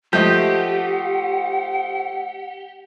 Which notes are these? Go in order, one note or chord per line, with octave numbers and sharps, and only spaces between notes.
F3 A3 G4 D#5 F#5 G6